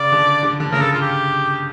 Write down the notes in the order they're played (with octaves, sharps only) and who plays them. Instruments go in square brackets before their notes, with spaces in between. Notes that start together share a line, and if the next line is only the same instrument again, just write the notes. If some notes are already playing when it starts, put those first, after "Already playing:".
Already playing: [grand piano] C#3 [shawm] D5
[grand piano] D3
D3
D3
[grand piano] C#3 [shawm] A#4
[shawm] A4
F4
G4